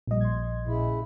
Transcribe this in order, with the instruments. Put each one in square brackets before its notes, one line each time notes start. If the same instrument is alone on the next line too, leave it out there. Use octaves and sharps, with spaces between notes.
[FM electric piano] A#1 D#5 [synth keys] A#2 G3
[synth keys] C6 G#6
[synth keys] A#2 [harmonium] C#3 E4